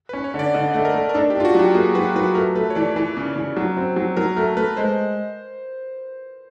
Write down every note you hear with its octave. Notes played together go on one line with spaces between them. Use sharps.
B4
C#4
C#5
D3
D5
D3 D#5
A3 D#5
A#4
A3
A#4
D4 A4
G4
D4 F4
F#4
F#3 G4
A#3 G#4
F#3 B4
F#3 B4
A3 A#4
A3 B4
C#5
E3 D5
E3
C#3
C#3
F#3
C4
F#3
F#3 A#4
A3 A#4
A3 B4
G#3 C5